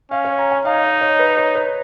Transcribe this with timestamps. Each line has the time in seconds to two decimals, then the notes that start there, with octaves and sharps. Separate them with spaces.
0.11 C#4 F5
0.25 C#5
0.38 A#5
0.51 G#5
0.65 D#4 F5
0.83 D#5
1.01 C#5
1.19 B4
1.37 C#5
1.55 B4